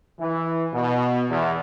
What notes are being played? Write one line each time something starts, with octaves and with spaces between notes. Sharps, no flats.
E3
B2
E2